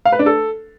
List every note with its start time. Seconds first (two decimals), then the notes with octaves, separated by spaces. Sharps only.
0.05 F5
0.12 B4
0.19 D4
0.26 A4